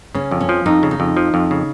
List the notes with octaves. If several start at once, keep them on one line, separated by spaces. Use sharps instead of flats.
C#3 C#4
F2
C#4
F3
F2 D#4
C#3
D#4
F2
F3
F2
C#3